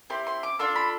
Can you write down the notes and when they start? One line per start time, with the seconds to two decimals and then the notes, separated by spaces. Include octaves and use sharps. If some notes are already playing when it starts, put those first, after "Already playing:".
0.10 C4 E4 G4 C6
0.27 C6
0.43 D6
0.59 D4 F4 A4 C6
0.76 B5